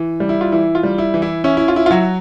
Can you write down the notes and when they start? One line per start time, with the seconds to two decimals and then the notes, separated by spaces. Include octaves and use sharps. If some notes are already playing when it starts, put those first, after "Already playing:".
Already playing: E3
0.20 G3
0.29 E4
0.41 F4
0.52 E3 E4
0.75 F4
0.83 G3
0.98 E4
1.14 E3
1.22 E4
1.44 C#4 E4
1.57 E4
1.68 F4
1.76 E4
1.86 F4
1.91 F#3 F#4